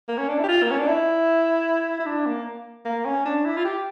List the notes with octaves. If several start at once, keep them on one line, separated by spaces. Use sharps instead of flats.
A#3
C#4
D4
E4
G4
F4
A#3
C#4
D4
E4
E4
D4
A#3
A#3
C#4
D4
E4
F4
G4